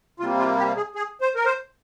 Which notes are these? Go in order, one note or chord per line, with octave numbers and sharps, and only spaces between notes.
C3 G3 A#3 F4
F4
G4
G#4
G#4
C5
A#4
C5